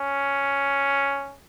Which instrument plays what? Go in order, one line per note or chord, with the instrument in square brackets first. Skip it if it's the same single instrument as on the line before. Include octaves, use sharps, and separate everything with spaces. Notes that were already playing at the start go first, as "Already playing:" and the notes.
Already playing: [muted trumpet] C#4